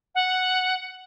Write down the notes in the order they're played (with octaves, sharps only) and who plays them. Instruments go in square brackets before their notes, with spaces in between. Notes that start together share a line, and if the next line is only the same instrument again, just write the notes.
[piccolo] F#5